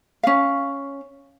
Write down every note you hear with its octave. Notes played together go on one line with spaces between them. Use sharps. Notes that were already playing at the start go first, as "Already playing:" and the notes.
C#4 F5